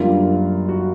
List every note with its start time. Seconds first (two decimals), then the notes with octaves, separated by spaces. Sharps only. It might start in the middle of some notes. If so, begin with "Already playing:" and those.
Already playing: F#2 D3 G3 A#3 F4
0.69 F#4